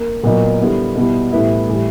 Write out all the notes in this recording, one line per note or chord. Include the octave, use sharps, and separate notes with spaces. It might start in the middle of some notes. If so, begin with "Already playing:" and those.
Already playing: A#3
A#2 F#3 B3 D#4
D3 G3 B3 E4
B2 G3 B3 E4
A2 E3 G3 B3 E4
A2 E3 G3